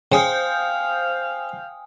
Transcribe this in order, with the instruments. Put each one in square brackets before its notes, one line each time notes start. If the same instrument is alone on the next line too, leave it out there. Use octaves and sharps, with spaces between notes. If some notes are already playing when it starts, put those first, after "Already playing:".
[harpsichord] C#3 [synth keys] C5 G6 [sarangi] F5 [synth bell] G5 G#5 D#6